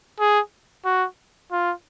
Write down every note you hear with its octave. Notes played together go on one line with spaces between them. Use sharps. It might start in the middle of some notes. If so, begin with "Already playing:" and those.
G#4
F#4
F4